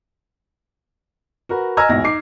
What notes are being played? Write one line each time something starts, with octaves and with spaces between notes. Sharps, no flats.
F#4 A#4 B4
D#5 G#5 A#5 E6 F6 G#6
A#1 E2 G#2 B2 A#6
D#4 D6 C7